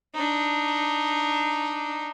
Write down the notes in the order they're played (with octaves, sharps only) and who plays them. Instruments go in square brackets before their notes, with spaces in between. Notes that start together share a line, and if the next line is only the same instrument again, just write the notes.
[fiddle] D4 D#4